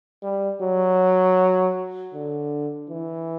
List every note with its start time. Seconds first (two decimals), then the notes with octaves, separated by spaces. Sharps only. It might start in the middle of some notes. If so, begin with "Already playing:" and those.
0.23 G3
0.61 F#3
2.14 D3
2.90 E3